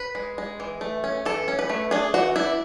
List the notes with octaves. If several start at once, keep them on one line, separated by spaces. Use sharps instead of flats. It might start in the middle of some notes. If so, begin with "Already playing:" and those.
Already playing: B4
G#3
G#3
E3
A3
C#4
E3 A4
C#4
B4
A3
D4 G#4
E3 F#4
D4 E4